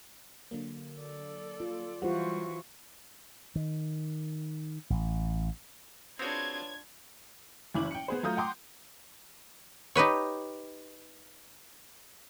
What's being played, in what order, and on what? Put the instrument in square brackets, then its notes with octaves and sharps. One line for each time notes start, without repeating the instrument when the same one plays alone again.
[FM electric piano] D3 F#3 A#3
[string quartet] A4 D5
[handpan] F4
[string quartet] E3 F#3 C#6 [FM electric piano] G3 [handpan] F4 C5 F#5
[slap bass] D#3
A1
[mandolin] B3 C#5 [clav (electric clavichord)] C4 F#4 G#4 [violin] D4 F4 [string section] G#6
[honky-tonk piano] F#1 E3 E4 D6 F#7
G5 C#7
B3 G#4 C5
F#3 A3 F4 A#5 D#6 G6
F#5 G5 A#5 C6 D6 D#6
[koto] D#4 G4 B4 C#5